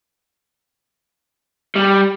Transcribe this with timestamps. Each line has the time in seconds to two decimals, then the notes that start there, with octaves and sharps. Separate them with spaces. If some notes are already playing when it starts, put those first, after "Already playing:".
1.76 G3